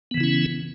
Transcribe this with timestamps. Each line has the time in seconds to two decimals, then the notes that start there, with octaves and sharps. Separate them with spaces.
0.11 B3
0.14 E3
0.17 C#3
0.20 E4
0.23 C#4